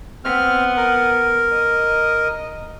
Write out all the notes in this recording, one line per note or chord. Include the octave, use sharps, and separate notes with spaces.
B3 C4 F6
A#4
D#5